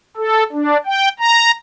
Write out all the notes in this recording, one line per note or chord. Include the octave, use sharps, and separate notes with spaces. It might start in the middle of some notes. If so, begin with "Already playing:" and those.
A4
D4
G5
A#5